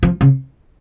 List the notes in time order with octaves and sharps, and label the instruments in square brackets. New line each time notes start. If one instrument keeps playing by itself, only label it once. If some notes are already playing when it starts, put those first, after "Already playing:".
[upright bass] F3
C#3